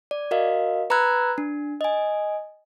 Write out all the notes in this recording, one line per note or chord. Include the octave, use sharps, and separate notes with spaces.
D5
F#4 A#4 D#5 F5
B4 A#5 B5 E6 F#6 G#6
D4
D#5 G#5